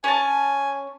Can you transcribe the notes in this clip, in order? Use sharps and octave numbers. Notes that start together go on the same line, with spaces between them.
C#4 G#5 A5